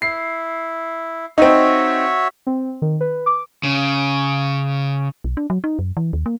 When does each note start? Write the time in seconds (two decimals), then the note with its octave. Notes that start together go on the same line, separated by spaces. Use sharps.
0.02 E4 C7
1.38 C4 D#4 F#4 C#5 E5
2.47 C4
2.82 D#3
3.01 B4
3.26 D6
3.63 C#3
5.24 B1
5.37 D4
5.50 F#3
5.64 D#4
5.79 F#2
5.97 E3
6.13 D#2
6.26 A#3